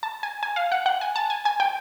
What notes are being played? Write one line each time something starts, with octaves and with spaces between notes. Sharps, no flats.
A5
G#5
G#5
F5
F#5
F#5
G#5
A5
G#5
G#5
G5